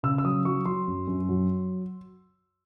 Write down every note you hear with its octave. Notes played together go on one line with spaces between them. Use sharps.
C#3 E6
E6
F#3 D#6
F#3 C#6
F#3 C6
F#2
F#2
F#3